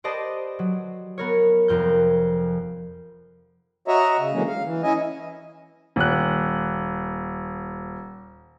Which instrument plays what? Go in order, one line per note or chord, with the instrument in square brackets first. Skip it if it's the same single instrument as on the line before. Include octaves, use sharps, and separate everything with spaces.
[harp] G4 B4 C5 D5 D#5 A5
F#3
B3 A#4 C#5
F1 F2 A#4 G6
[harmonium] F#4 C#5 D#5 E5 A#5
C#3
D3 E3 F#3 G#3 A#3 C#4
F5
E3
C#4 E4 D#5 G#5
[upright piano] D#1 F#6